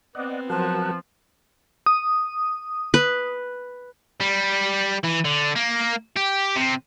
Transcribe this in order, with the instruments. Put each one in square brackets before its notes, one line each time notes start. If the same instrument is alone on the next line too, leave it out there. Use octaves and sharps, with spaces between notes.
[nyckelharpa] B3 C4 [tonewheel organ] D5 D#5 F#5
[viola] F3 [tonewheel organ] F#3 A#4 F#5 [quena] A5
[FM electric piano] D#6
[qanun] B4
[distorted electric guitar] G3
E3
D3
A#3
G4
C3